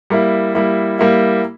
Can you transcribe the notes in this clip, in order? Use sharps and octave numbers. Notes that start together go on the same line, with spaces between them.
G3 A#3 E4
G3 A#3 E4
G3 A#3 E4